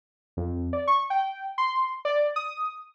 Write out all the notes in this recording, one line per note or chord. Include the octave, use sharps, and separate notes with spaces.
F2
D5
C#6
G5
C6
D5
D#6